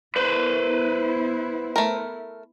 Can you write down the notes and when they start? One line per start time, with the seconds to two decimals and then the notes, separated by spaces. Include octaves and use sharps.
0.16 B3 E4 B4 C5
1.76 A3 A#4